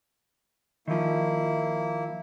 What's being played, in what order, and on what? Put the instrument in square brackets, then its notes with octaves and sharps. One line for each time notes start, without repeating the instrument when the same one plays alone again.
[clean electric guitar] D#3 F3 [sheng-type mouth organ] A#3 E4